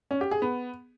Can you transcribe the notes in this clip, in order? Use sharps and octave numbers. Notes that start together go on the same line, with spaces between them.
C#4
G4
G#4
B3